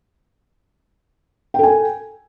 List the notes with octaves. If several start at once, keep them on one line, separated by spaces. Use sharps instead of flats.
A4 G5 G#5